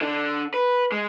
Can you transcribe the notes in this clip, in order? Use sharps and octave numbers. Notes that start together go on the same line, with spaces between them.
D3 D4
B4
G#3